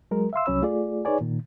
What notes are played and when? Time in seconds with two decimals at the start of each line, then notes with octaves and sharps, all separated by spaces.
0.11 F#3 G#3 A#4
0.33 E5 F5 C6 E6
0.46 C2 F#3 C#4 C#5 B5 E6
0.62 A3 F4 G#4 D5
1.05 D#4 G#4 B4 C#5 D5 G#5
1.21 A#2 D#3